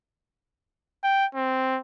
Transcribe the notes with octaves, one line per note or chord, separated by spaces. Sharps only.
G5
C4